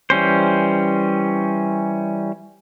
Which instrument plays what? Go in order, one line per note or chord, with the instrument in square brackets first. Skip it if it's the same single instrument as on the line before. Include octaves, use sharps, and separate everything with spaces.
[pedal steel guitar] E3 G3 C#4 C5